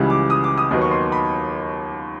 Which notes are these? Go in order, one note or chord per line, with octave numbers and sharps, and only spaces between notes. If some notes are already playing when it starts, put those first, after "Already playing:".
Already playing: C#2 C#3 E3 G3
D6
D#6
D6
D#6
D#2 D#3 F#3 B3
C#6
C6
B5